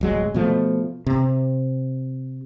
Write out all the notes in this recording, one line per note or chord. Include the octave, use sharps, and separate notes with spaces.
D1 F#3 G#3
B2 F3 A3
C3